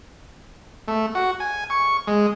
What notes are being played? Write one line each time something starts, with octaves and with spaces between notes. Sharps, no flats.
A3
F#4
G#5
C#6
G#3